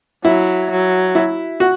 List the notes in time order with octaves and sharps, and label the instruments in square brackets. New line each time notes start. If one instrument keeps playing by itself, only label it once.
[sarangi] F#3 [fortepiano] E4
[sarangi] F#3
[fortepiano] E4
F#4